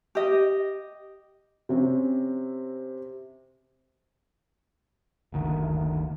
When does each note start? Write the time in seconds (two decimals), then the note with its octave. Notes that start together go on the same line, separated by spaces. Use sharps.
0.15 G4 D#5
1.69 C3 C4 C#4
5.32 F#1 D2 D#3